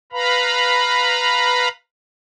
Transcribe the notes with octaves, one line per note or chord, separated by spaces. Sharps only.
B4 F5 A#5 B5